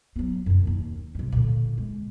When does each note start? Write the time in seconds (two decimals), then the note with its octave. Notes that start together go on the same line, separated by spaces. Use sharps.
0.16 F#3 B3
0.46 F#2 C#3
0.63 D#2 D#3
1.15 G2 C3
1.32 A#2 D3
1.78 G#3